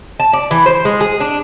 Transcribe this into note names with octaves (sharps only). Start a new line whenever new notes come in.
A5
D5
E3
C5
G#3
G#4
D4